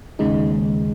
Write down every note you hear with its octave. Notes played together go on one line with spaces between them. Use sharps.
D#2 C#3 G#3 D#4